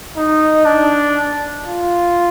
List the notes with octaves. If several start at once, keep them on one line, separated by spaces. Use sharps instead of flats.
D#4
D4
F4